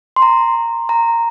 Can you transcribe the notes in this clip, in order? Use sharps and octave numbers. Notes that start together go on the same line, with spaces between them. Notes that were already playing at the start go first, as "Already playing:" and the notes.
C6
A#5
A#5